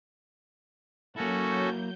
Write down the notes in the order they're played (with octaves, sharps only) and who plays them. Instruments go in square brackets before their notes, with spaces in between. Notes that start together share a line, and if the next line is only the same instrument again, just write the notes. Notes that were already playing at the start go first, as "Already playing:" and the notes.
[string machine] F#3 G6 [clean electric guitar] A#3 E4 [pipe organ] C#4 F#4 A4